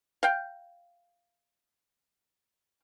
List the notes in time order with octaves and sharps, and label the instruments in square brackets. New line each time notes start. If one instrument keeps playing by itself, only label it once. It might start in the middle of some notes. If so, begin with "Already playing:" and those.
[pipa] F5 G5